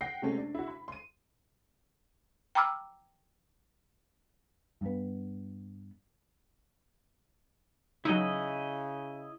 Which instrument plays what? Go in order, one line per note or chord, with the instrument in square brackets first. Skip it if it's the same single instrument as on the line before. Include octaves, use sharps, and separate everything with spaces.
[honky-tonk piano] F#5 G5 A#6 C7
C3 G#3 A3 C4 C#4
D4
E4 F#4
B5
C6 D#7
[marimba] G5 A#5 B5 D6 E6 F6
[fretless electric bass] G2 B3
[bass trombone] C#3 [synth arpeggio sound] F#3 D#4 [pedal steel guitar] E4 D#5